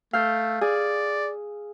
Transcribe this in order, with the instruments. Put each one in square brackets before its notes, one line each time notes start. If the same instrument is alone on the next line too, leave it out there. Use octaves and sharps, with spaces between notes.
[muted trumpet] A3 [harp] F5 E6 G6
[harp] G#4 [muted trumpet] D5